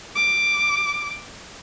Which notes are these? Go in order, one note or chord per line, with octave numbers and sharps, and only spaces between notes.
D6